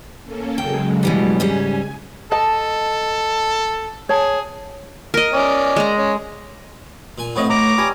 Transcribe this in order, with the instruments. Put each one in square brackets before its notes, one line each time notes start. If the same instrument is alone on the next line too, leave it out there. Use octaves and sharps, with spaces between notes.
[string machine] A#3 C#4 A4
[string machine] C#3 F#3 G#3 [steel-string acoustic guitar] G5
[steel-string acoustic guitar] B2 E3 G3
[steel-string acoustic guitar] G#2 G3 C#4 [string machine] G#5
[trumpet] A4 [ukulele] D#5 A5
[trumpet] G#4 [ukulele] C#5 A5
[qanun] A#4 D#5
[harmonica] C#4 D5
[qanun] G#3 A#5
[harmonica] C#4
[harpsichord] A#2 G#5
[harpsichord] A2 F3 C4 [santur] B3 C#5 D#5
[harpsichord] A2 [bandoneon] A#5 D6
[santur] G3 G#5 [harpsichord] D#6